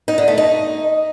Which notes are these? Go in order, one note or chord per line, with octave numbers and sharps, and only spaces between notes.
D#4
D3
A3
D#4